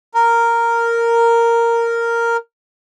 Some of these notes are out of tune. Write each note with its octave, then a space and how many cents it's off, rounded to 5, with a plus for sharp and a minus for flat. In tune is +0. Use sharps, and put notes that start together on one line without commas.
A#4 -5